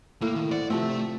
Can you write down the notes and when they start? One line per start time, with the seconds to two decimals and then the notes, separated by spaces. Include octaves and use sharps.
0.22 A2 A#3
0.35 D#3
0.51 C5 D5 F#5
0.70 C3 F3 A3 C4 E5